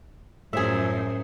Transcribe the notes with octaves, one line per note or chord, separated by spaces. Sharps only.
F#2 A2 F3 F#3 G#4 E5